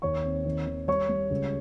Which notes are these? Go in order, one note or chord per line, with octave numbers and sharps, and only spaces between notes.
D#2 C#5 C#6
C4
D#3
D#3
G3 C#5 C#6
G3
C#2